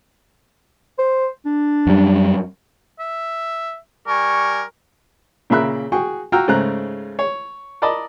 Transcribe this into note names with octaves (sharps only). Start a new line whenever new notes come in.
C5
D4
F#2 G3
E5
G3 A#4 G#5 C#6
A#2 C#3 A#4 E5 B5 F#6
F#4 G#4 G5 C#6
F4 F#4 G5 A#5 E6 F6
G#2 C#3 A3 C5 A#5 F#6
C#5
A#4 D5 D#5 A5 B5